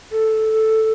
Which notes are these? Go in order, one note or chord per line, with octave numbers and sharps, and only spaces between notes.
A4